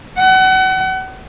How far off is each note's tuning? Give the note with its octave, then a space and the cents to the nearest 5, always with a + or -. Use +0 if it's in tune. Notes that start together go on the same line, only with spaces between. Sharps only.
F#5 +30